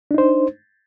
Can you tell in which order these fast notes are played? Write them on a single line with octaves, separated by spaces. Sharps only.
D4 D#4 C5